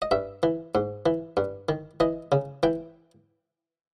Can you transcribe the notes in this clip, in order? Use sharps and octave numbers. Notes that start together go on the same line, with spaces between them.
D#5
G2 E5
E3
G#2
E3
G2
D#3
E3 D#5
C#3
E3 G5